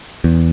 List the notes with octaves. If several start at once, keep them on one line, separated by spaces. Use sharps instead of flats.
E2